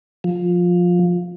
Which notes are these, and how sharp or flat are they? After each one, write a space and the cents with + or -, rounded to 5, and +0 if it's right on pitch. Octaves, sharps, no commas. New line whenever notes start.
F3 +15